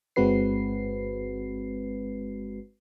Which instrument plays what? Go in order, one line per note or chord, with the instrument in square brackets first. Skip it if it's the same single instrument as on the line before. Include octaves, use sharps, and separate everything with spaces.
[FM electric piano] G1 G#3 C4 F#4 B4 C7